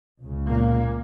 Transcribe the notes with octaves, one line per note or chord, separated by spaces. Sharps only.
C#2 C#3
A#2 A#3